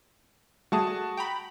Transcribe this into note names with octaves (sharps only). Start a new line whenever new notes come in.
G3 A3 F#4 G#4 A5 D#6
G5 A#5 B5